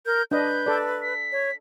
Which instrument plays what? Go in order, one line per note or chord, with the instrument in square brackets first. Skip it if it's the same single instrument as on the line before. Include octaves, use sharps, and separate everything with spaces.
[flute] A#4 [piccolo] G6
[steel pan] D4 D#5 [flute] B4 [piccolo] G6
[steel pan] A4 D5
[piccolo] B6
[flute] C#5